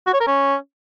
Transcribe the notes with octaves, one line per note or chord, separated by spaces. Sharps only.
F#4
C#5
A#4
C#4